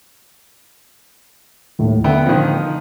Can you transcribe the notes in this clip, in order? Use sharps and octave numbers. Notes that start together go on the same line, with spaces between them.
D#2 A2
D3 B3 E5 G5
D#3 F3